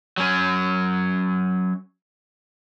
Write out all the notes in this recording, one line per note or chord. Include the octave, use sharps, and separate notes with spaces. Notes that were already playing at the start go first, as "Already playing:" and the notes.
F#3 C#4